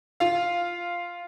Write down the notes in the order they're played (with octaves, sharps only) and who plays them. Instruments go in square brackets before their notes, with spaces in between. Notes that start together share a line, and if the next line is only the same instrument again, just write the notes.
[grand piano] F4 F5